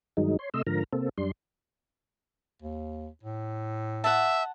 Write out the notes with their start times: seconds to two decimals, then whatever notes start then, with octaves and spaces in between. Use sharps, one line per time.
0.17 G2 D#3 F#3 G#3 D#4
0.39 C#5 C6
0.54 C3 A3 D#5 C6 E6
0.67 G#2 D3 F3 A#4 A#5
0.93 C3 A#3 C4 A4
1.18 F#2 G3 D4 C6
2.62 D#2
3.23 A2
4.04 E5 F#5 A5